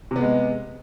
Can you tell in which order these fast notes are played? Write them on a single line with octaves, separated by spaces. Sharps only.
C3 B3 G#3